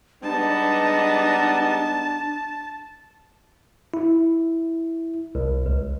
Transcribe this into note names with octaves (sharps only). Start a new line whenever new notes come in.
G3 G#3 B3 D4 D#4 A5
E4
C2
C#2